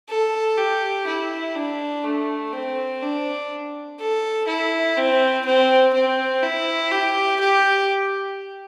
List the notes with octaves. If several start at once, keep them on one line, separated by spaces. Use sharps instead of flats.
A4
G4
E4
D4
A3
C4
D4
A4
E4
C4
C4
C4
E4
G4
G4